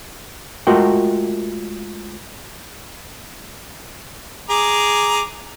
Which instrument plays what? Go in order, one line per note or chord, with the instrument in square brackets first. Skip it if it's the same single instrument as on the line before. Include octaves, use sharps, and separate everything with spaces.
[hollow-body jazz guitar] G#3 A3 F4 F#4 A#4 G5
[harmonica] G#4 A#5 D6